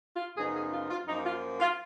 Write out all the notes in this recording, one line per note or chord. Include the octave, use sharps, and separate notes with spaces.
F4
F#2 C#3 F3 B3 D#4 G#4
G#4
F4
F4
F#2 F3 A#3 D#4
F4
F4